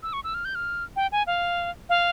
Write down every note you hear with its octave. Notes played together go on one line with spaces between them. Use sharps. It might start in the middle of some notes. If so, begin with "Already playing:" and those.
E6
C#6
E6
F6
G6
F6
G5
G#5
F5
F5